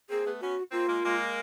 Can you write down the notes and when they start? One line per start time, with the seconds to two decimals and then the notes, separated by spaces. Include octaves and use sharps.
0.10 A#3 C4 G#4
0.25 A3 B3
0.41 B3 C#4 F#4
0.72 A#3 C4 F4
0.88 G#3 A#3
1.03 G#3 A#3